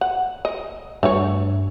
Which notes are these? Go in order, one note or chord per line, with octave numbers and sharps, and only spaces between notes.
F#5
D#5
G2 A3 F#4 C#5